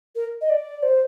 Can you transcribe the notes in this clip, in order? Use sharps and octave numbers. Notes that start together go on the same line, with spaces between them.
A#4
D#5
D5
C5